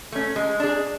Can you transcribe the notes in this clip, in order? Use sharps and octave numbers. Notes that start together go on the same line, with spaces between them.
A3 C#4
G#3
D4 G#4